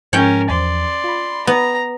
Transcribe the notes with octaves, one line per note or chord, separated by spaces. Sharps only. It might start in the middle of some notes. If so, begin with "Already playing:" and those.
G#2 F3 G#3 C#4 A#4 C#5 G5
E2 F3 C5 D5 C6
F4 B5
B3 A#5